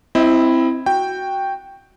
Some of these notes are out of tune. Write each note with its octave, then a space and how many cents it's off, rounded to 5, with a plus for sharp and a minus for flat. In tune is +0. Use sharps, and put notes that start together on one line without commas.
C4 +0 E4 +0 D#5 +30
F#4 +0 G5 +0